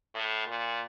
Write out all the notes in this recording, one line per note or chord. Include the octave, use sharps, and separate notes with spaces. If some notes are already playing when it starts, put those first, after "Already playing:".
A2
A#2